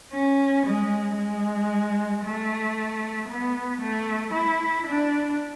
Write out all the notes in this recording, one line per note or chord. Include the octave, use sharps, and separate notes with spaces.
C#4
G#3
G#3
A3
B3
A3
E4
D4